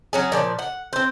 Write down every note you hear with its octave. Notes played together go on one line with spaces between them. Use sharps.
F#3 C#4 G#4
A#2 F3 D5
F#5
C4 C5